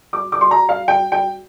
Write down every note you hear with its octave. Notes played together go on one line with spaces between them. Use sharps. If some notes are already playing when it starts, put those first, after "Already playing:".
D6
D6
C6
A#5
F5
G5
G5